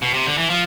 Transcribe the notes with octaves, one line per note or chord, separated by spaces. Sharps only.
B2
C3
D3
E3
F3